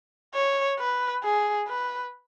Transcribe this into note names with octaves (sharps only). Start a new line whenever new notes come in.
C#5
B4
G#4
B4